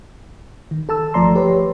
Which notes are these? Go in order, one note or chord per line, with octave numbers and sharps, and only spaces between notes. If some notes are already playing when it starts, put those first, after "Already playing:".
D#3
A4 A5 E6
G1 F3 A3 D5 A#5 C6
G4 B4 C#5